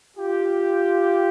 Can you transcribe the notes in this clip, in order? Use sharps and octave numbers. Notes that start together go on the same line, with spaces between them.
F4 G4